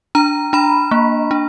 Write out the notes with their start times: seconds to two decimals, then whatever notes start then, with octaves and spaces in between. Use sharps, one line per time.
0.15 D4 A#5
0.53 D4 B5
0.91 A#3
1.31 D4